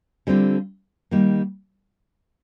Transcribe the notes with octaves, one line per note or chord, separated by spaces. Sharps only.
D3 G3 C4 F4
D#3 G3 A#3